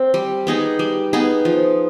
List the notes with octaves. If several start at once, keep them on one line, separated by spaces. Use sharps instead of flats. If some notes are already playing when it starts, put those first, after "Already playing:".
Already playing: C4
G3
B3 D#4 G#4
G3
B3 D#4 G#4
F3